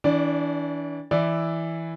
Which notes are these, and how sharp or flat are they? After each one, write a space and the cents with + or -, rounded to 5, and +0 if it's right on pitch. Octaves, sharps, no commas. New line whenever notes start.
E3 -30 D4 -40 D5 +0
E3 +0 E4 +0 D5 +0